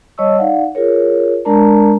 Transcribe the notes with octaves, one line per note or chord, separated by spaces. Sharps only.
G3 C#5 D#5 A5 C#6 E6
D#4 D5 F5 F#5
F4 G#4 A#4 C#5
G#3 D4 A#4 D5 A5 A#5